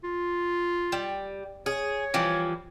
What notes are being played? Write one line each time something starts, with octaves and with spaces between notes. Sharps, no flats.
F4
G3
G#4 C#5
E3 F3 G3